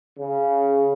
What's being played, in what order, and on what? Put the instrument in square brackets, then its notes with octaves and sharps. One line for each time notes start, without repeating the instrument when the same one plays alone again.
[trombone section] C#3